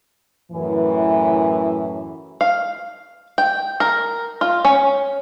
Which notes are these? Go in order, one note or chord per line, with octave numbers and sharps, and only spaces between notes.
F#2 A2 E3
F5
G5
A#4
F4
C#4